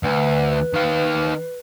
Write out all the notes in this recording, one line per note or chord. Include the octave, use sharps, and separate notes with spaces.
D2 B4
D#3 F5